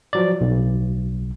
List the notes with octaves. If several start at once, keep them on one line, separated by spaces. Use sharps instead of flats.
F3 F#3 D5
B1